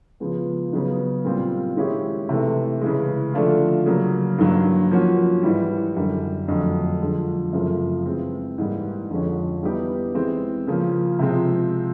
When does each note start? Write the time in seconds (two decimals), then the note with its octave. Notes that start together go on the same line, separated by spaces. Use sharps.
0.20 C#3 F3 G#3 B3
0.72 C#3 F#3 B3 D#4
1.25 A#2 G3 C4 F4
1.76 D#3 G#3 C#4 E4 G4
2.29 C3 E3 A3
2.81 C#3 E3 G#3
3.34 D3 F3 A3 D4 F4
3.86 C#3 F#3 A#3
4.38 G2 D#3 F#3 A#3
4.91 F3 A#3 C#4 F#4
5.43 G#2 E3 G3
5.96 F#2 D3 G3
6.48 F2 D3 F#3 A3
7.01 D3 F3 G#3
7.53 F#2 C#3 F3 A3 C4
8.06 E3 G#3 C4
8.58 G#2 E3 G3 A#3
9.10 F2 D3 F3 G#3 C#4
9.63 E3 G3 B3 D#4 G4
10.15 E3 G#3 C4
10.67 C#3 F3 A#3
11.19 C3 F3 G#3 C4